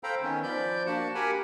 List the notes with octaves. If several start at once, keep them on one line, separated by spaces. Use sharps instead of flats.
A4 C5 F5 G5 A#5 B5
D#3 B3 C#4
F3 D5 B5 G6
A#3 D4 F#4 F#5 A5
G4 A#4 F#5 G#5 B5